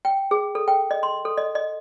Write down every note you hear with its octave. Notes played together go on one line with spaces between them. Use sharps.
G5
G#4
A4
G5
D#5
C6
A4
D#5
D#5